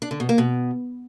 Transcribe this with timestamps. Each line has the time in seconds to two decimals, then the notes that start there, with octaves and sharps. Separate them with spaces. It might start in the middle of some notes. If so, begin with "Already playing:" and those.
0.02 D4
0.11 D3
0.20 B2
0.29 A#3
0.38 B2